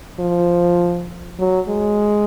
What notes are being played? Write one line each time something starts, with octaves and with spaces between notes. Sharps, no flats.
F3
F#3
G#3